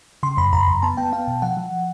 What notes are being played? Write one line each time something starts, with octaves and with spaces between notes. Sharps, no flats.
C#3 C6
F#2 B5
F#2 A#5
F#2
B3 A5
B3 G5
B3 F5
B2
F3 F#5
F3